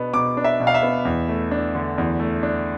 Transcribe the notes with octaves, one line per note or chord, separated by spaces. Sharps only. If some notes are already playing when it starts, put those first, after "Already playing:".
Already playing: B2 B3 D4
B2 D6
D4
E5
B2
F5
E5
B3
E2
A3
D4
D3
E2
A3
D4